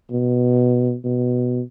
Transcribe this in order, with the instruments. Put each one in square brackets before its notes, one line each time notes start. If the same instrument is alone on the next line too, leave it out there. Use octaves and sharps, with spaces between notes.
[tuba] B2
B2